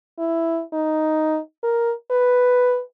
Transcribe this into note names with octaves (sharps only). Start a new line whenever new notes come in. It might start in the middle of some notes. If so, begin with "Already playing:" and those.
E4
D#4
A#4
B4